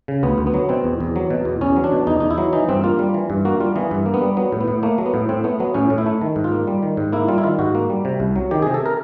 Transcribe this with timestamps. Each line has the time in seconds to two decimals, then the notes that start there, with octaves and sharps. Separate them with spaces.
0.08 C#3
0.23 D2 B3
0.38 D2
0.47 B3
0.54 F#3
0.69 B2 C4
0.84 E2
1.00 E2
1.16 F#3
1.30 B2
1.45 E2
1.61 E2 C#4
1.76 F#3
1.84 D4
1.92 B2
2.07 E2 D#4
2.20 E2 D#4
2.31 E4
2.38 F#3
2.53 E3 D#4
2.69 G2 C4
2.84 A#3 F4
2.99 G3
3.14 E3
3.30 G2
3.45 A#3 F#4
3.60 G3 F4
3.76 E3 B3
3.91 G2
4.06 A#3
4.14 B3
4.22 G3
4.37 F#3 B3
4.52 A2
4.61 B3
4.68 A2
4.83 A3 A#3
4.98 F#3
5.06 B3
5.14 A2
5.29 A2 C4
5.44 A3 B3
5.60 F#3 B3
5.74 A2 C#4
5.90 A2
5.98 E4
6.06 A3
6.21 D#3
6.36 G#2
6.44 F4
6.52 A#3
6.67 G3
6.83 D#3
6.97 G#2
7.13 A#3 E4
7.28 G3 F4
7.38 E4
7.43 D#3 F4
7.59 G#2 F#4
7.75 A#3
7.90 G3
8.05 C3
8.20 C2
8.36 F#3
8.51 D#3 G4
8.62 G#4
8.67 C3
8.74 A4
8.86 A#4